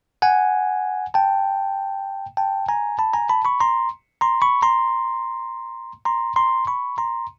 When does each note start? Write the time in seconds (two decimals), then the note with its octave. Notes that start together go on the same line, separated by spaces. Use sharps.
0.22 F#5 G#5
1.14 G5 A5
2.37 G5 A5
2.68 G#5 A#5
2.99 A5 B5
3.14 G#5 A#5
3.29 A5 B5
3.45 B5 C#6
3.60 A#5 C6
4.21 A#5 C6
4.42 B5 C#6
4.62 A#5 C6
6.05 A#5 C6
6.36 A#5 C6
6.67 B5 C#6
6.98 A#5 C6